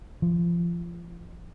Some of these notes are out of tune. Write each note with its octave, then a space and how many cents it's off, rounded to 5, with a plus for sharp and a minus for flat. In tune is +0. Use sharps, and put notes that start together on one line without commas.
F3 -25